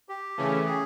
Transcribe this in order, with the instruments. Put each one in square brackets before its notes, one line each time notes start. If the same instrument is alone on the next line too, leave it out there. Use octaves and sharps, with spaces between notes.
[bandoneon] G4
[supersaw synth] C#3 E3 A3 C#4
[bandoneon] G#4